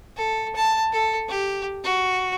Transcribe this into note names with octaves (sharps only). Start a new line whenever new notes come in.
A4
A5
A4
G4
F#4